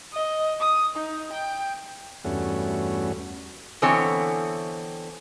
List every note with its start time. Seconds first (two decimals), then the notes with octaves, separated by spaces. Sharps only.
0.13 D#5
0.61 D#6
0.96 D#4
1.33 G5
2.25 E2 G2 A3 C#4 F#4
3.82 D3 E3 B3 C4 C#5